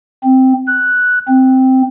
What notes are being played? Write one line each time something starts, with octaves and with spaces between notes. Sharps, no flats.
C4
F#6
C4